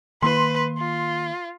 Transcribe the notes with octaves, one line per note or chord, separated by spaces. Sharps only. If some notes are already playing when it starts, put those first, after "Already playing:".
D#3 A#3 B4 C6
F4